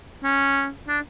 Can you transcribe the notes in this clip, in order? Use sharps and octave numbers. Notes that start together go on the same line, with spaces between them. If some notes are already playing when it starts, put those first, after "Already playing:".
C#4
D4